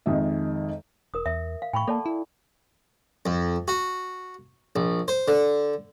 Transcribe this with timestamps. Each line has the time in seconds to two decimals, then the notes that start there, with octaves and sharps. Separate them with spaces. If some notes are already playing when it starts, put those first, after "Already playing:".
0.06 F2 D#3 G#3 D#5 E5
1.14 E1 A#4 D#6
1.26 E2 E5
1.62 F5
1.74 A2 G5 B5 C#6
1.88 A#3 A4 D5 A5
2.06 E4
3.26 F2
3.68 F#4
4.76 A#1
5.08 C5
5.28 D3